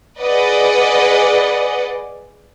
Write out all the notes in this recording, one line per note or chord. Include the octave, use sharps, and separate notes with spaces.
G#4 B4 D5 D#5 F#5